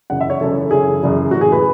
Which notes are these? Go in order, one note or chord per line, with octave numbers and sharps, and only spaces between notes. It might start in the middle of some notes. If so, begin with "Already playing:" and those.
F#2 C#3 E3 F#5
E5
C#5
F#2 C#3 E3 A4
F#2 C#3 E3 G#4
F#2 C#3 E3
A2 E3 F#4
G#4
B4